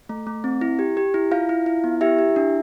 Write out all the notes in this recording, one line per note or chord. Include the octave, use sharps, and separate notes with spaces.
A3
A3
C4
E4
G4
G4
E4
E4 F4 F5
E4
E4
B3
E4 G4 E5
G4
D4